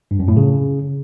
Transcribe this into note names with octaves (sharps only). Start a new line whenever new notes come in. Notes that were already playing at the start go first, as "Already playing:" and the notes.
G2
F#2
A2
C#3